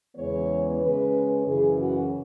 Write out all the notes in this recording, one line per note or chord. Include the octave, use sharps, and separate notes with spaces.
E2 C#3 E3 G#3 B3 C#5
C#3 G#3 C#4 B4
F#2 C#3 E3 G#4
F#4